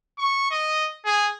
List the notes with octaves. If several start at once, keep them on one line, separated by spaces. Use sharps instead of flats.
C#6
D#5
G#4